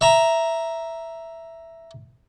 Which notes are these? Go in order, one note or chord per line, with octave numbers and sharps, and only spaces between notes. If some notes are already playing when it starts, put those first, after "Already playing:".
E5 A#5